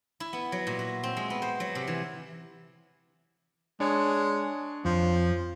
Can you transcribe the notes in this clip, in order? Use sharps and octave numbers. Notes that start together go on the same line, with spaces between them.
E4
B3
F#3
A#2
F#4
C4
G#3
B3
C5
F#3
C3
E3
G#3 D4 C#5
F2 F3